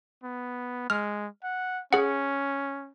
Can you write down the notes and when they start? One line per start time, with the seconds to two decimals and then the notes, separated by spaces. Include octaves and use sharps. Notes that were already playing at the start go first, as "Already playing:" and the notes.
0.23 B3
0.90 G#3 F6
1.43 F#5
1.93 C#4 G#4 F#5